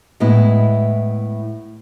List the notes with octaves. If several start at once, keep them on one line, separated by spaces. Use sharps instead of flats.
A2 G#3 B3 E4